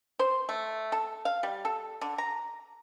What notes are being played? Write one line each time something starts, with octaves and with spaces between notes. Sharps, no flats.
C5
A3
A4
F5
G3
A4
D3
A#5